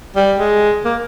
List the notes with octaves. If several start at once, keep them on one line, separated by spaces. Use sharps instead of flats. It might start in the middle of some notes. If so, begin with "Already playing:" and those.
G3
G#3
A#3